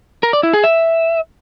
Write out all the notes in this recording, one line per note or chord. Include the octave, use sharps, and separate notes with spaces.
A#4
D5
E4
G#4
E5